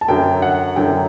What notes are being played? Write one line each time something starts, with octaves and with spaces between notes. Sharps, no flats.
A5
F#2 D3 F#3 G5
F#5
F#2 D3 F#3 G5